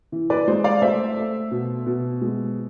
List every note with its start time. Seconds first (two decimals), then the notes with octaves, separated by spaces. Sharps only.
0.12 E3
0.30 B4 D5
0.48 G#3 C5
0.64 D5 F5
0.81 A3 C5 E5
1.17 A3
1.51 B2
1.86 B2
2.21 G#3